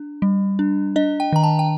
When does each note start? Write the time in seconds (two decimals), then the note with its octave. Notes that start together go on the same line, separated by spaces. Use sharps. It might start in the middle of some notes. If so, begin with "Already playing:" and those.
Already playing: D4
0.22 G3
0.59 D4
0.96 D4 D#5
1.20 G5
1.32 D#3 A#5
1.43 A5
1.59 G5